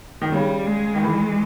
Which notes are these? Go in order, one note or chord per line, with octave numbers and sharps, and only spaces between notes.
D#3
C#3 G3
G#3
D#3
E3